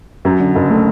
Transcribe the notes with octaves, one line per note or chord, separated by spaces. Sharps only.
F#2
D3
F#1
A3